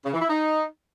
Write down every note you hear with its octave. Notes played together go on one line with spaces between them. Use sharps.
C#3
E3
E4
D#4